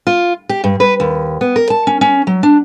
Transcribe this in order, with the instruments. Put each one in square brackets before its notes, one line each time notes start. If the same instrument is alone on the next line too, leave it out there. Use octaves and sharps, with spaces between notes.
[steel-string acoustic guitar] F4
G4
G2
B4
D#2
B3
A#4
A5
C#4
C#4
F#3
D4